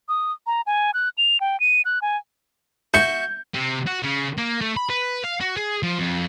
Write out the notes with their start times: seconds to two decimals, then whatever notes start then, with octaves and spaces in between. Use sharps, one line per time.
0.09 D#6
0.47 A#5
0.67 G#5
0.94 F#6
1.18 F7
1.40 G5
1.60 D#7
1.85 F#6
2.02 G#5
2.94 F#4 E5 C#6 G6
3.54 C3
3.87 F#4
4.03 C#3
4.38 A#3
4.61 A3
4.77 B5
4.90 B4
5.24 F5
5.41 F#4
5.57 G#4
5.83 F3
5.99 F2